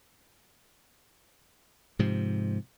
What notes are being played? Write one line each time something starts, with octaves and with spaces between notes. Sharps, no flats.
G#2 C3 F3